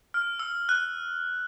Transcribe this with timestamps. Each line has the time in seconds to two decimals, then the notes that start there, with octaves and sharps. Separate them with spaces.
0.14 F6
0.39 E6
0.69 F#6